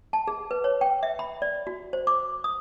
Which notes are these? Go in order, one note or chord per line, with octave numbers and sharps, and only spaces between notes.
A5
G#4
B4
C#5
G5
E5
B5
D5
F#4
C5
D6
D#6